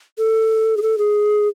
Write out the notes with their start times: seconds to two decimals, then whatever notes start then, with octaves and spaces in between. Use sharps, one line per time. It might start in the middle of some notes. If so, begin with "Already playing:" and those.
0.19 A4
0.77 G#4
0.82 A4
0.98 G#4